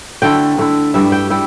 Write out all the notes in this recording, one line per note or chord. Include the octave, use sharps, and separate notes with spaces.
D3 A3 E4 G5
D3 A3 E4
G2 G3 E4 E5
G5
G3 E4 G5